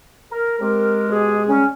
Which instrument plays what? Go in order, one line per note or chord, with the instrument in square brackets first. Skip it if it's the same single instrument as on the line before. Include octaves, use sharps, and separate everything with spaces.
[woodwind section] A#4
[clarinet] G#3 [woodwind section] C4 G4 A#4
[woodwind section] B2 G4 G#4
C#3 G3 C#4